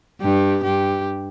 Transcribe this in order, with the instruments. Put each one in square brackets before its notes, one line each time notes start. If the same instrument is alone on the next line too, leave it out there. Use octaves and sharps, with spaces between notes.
[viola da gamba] G2 [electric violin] G4
[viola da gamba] G2 [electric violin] G4